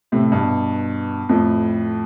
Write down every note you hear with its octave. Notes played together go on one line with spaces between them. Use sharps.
A2 C3
G2 B2
F2 A2